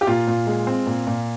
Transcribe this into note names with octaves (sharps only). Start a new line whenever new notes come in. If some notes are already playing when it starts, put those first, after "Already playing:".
G4
A#2 F4
A#2
G#3
C4
A#2
A#2